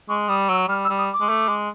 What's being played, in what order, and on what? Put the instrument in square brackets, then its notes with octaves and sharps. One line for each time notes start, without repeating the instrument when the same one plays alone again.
[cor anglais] G#3 [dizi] C#6
[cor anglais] G3 [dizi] D#6
[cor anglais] F#3 [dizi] E6
[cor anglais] G3 [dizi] F6
[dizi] E6
[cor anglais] G3
[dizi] D#6
D6
[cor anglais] G#3
A3
G#3